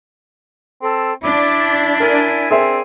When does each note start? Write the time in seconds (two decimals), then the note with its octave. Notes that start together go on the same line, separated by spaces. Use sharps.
0.82 C4 A4
1.23 D4 E4 D6
2.00 E4 A#4 G#5
2.51 C4 G#4 A#4 E5